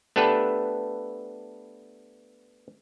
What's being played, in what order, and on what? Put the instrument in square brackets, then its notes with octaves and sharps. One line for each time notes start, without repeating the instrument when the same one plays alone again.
[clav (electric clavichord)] A3 B3 D4 G4 A4 B4